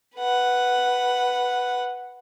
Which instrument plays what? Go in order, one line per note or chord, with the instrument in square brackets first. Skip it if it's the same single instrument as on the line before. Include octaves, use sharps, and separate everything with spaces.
[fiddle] B4 F#5